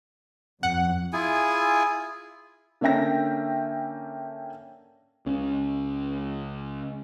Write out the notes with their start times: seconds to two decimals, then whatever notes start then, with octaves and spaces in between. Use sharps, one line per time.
0.63 F2 F#5
1.13 E4 F4 G#4 G#5
2.81 D3 A#3 C#4 E5 G5 A#6
5.26 C#2 G#3 C#4